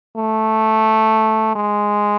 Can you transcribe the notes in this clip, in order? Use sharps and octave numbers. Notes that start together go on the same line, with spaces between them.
A3
G#3